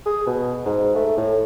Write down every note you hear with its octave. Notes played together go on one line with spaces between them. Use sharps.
G#4
B2
G#2
A3
A2